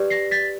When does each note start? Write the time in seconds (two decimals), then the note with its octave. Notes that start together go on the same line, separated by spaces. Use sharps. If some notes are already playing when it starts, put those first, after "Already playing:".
Already playing: G4 B4 D5
0.10 A#6 C7
0.31 A6 B6